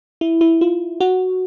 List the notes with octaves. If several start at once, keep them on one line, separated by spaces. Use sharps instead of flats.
E4
E4
F4
F#4